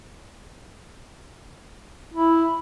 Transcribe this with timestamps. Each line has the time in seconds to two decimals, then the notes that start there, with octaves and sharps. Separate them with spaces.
2.14 E4